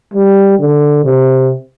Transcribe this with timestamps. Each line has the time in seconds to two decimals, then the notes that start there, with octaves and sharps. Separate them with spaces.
0.14 G3
0.59 D3
1.04 C3